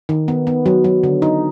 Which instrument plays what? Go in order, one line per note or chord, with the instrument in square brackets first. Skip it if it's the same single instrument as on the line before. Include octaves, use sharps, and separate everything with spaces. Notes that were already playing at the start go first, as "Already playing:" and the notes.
[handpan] D#3
B3
B3
F#3
F#3
D3
D#4